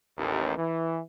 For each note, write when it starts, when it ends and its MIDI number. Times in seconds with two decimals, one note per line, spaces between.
0.18 0.53 33
0.18 0.53 39
0.57 0.99 52